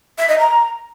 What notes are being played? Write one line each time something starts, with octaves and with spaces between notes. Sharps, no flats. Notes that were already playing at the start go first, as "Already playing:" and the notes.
E5
D#5
A#5